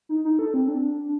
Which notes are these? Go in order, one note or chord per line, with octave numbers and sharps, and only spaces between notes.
D#4
D#4
A4
C4
D4